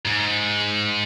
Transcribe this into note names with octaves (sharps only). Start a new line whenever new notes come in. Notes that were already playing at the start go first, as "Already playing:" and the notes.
G#2